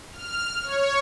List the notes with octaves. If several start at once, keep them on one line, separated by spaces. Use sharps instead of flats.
F6
C#5